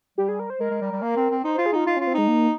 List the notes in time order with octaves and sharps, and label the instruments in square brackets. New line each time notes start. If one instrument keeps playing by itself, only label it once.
[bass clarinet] G3 [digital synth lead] G4
[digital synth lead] G#4
A#4
C5
[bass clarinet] G#3 [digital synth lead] A#4
[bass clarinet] G#3
G3
G3
A#3
C4
C4
[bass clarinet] D#4 [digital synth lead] C5
[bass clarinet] F4 [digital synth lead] C5
[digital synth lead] G#4
[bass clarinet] D#4 [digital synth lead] F4
[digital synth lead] D#4 [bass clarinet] F4
[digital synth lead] C#4 [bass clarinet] F4
[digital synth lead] C4
[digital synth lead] G#3 [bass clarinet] D#4
[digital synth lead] A#3